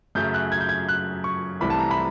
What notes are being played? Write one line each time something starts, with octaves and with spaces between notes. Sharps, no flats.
F#2 C#3 F#3 A3 G6
F#6
G#6
G6
G#6
F#6
C#6
C2 C3 E3 A3 B5
A5
A#5
B5